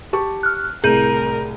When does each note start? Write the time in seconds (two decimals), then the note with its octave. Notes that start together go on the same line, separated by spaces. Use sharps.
0.13 G4 A5 C#6
0.43 F6 F#6
0.84 C2 A2 G#4 A#4 G6 D#7